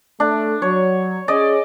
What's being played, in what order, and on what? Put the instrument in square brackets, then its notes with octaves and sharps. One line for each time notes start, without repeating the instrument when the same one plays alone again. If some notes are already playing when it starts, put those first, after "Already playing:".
[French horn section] A3 [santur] D4
[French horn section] F#3 [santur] C#5
[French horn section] C#4 G#4 [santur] D5 D#5